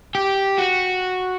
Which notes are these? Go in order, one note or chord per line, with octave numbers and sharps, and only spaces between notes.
G4
F#4